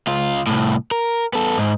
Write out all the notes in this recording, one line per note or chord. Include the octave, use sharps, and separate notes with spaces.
C#2 F4
C2 A2
A#4
B3 A4
G#2